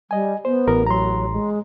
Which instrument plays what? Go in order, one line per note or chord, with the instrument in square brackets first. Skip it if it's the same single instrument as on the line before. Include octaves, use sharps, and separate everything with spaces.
[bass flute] G3 [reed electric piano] D#5 G#5
[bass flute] B3 [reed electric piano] C5
[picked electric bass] A1 [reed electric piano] A#4
[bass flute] F#3 [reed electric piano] A#5 C6
[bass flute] G#3